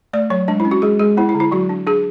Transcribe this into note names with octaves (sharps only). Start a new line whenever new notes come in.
A3 D5
F#3 C#5
G#3 D4
E4
C#4
F#4
G#3 G#4
G#3 G#4
B3 E4
E4
D3
E4
F#3 F#4
D4
D4 G#4